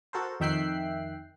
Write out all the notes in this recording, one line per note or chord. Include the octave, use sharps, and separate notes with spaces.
F#4 A4 A#4 C5
F2 D#3 E5 G5 F#6 C7